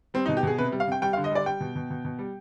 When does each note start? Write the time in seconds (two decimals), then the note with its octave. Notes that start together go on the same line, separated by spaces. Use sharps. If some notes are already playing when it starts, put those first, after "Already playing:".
0.14 G3 C4
0.26 D#4
0.29 B2
0.37 G4
0.43 B2 G#4
0.58 C3 B4
0.72 G3
0.80 F5
0.88 C3 G5
1.02 G3 G5
1.13 F5
1.17 D3
1.24 D#5
1.31 G3 D5
1.46 G3 G5
1.60 B2
1.75 B2
1.90 B2
2.05 B2
2.19 G3